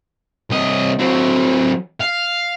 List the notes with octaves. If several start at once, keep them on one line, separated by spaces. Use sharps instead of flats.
C2 D#5
F#3 C4
F5